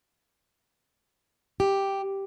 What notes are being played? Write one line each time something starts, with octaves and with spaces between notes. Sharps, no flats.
G4